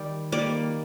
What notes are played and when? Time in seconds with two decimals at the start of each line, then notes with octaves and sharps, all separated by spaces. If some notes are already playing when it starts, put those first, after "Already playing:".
Already playing: D#3 G3 D5
0.32 D#3 G3 A#3 D5